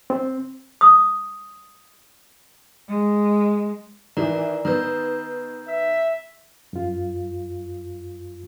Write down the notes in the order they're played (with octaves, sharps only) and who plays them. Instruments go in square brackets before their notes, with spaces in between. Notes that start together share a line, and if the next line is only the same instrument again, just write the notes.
[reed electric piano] C4
[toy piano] D#6
[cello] G#3
[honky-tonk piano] D#3 E3 [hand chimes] A#4 D5 A#5
[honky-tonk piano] D#3 B3 [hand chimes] A#5 E6 G6
[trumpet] E5
[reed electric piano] F#2 F4